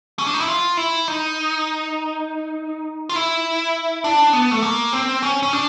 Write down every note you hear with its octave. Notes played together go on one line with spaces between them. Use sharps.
C#4
D4
D#4
E4
F4
E4
D#4
F4
E4
D4
B3
A3
A#3
C4
C#4
C#4
D4